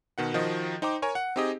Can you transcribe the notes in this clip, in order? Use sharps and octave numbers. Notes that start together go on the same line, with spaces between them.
B2 D#3 F#5
D#3 F3 F#4 D#5
D#4 C5 G5 A#5 D6
A#4 C#5 G#5 C#6
F#5
C4 D#4 G4 G#4 D#5